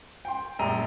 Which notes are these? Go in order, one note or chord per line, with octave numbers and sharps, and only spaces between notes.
G5 C6
A#1 F#2 G3 A#5 D#7 F7